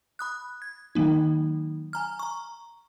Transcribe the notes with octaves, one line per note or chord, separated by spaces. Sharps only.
B5 D#6 F#6
G#6
D#3 F#3 A#3 D#4
G#5 A#5 F6
A#5 C#6